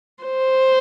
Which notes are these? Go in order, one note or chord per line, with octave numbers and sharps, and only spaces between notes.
C5